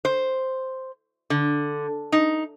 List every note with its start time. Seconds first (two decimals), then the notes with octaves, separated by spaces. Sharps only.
0.05 C5
1.30 D3
2.12 D#4